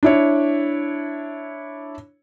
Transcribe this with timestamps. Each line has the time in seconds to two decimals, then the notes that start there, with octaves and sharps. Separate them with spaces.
0.03 D4 E4 C#5